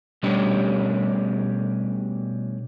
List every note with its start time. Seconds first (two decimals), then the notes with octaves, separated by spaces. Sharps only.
0.23 B2 G3 A3 C#4 D4 G4